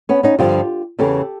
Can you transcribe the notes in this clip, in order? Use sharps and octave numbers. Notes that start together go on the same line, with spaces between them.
B3 C#4
C#4 D#4
G2 D3 F3 F4 G4
E2 C#3 E3 G4 A4